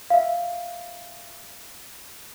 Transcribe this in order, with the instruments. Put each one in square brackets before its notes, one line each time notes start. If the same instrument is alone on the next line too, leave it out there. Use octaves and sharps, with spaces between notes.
[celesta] E5 F5